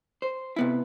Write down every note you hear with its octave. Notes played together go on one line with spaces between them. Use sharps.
C5
C3 B3 E4